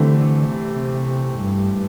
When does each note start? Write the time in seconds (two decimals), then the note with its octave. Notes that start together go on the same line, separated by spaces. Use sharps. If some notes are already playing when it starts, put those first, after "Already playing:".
Already playing: D3 E3 A3 C4 G4
0.49 C3
1.40 G2